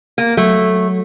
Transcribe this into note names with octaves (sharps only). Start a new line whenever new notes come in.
A#3
F#3 A3